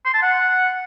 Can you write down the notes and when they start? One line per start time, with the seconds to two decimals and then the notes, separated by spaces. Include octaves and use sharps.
0.05 C6
0.14 A5
0.23 F#5